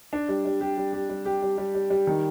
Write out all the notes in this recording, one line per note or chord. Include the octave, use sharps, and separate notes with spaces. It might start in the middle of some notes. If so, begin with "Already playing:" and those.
D4
G3
G3
G4
G3
G4
G3
G4
G3
G3
G3
G3
D#3